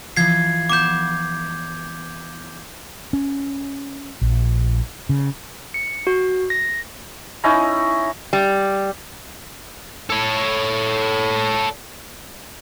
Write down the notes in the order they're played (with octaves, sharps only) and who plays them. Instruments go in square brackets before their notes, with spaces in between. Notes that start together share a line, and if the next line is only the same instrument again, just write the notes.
[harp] E3 F3 [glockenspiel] G#6 C7
[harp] B3 E7 [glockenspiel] D6 G6
[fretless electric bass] C#4
A#1
C#3
[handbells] C#7
F#4
A#6
[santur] C#4 D#4 E4 A#5
[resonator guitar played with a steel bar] G3
[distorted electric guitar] A4 C#5